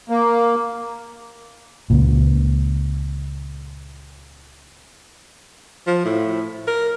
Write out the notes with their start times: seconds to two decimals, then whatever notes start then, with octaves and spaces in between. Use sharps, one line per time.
0.10 A#3
1.90 C#2 A#2
5.87 F3
6.05 A2
6.68 A#4